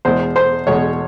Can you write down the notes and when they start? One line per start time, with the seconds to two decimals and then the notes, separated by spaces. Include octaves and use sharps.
0.05 E2 B2 G#3 C5
0.36 C5
0.67 E2 B2 G#3 C#5